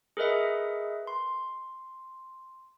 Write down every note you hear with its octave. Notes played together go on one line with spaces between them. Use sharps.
G#4 A#4 B4 D#5 E5
C6